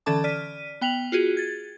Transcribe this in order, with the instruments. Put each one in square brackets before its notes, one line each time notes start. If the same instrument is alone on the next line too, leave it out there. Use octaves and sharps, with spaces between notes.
[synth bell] D3 E3 C#4 A4 A5 D6
D5 F6 B6 D#7
B3 G5 B6 F7 F#7
F4 F#4 G#4
G#6 A6